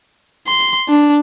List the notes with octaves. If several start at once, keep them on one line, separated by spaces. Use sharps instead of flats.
C6
D4